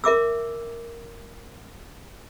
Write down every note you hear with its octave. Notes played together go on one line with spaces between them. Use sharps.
A#4 E5 D6 E6